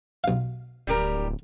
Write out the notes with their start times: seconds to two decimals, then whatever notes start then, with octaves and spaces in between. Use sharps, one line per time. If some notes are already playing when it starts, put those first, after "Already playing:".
0.24 B1 F5
0.87 D1 G3 G4 A#4